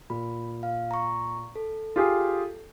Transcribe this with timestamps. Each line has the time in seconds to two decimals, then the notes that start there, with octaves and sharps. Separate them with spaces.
0.10 A#2 B5
0.63 F5
0.91 A#5 C#6
1.56 A4
1.96 F4 G4 G#4